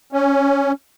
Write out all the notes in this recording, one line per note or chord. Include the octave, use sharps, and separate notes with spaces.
C#4